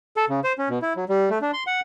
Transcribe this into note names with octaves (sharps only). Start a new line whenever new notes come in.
A4
C#3
C5
C#4
B2
E4
F#3
G3
A3
D4
C6
F#5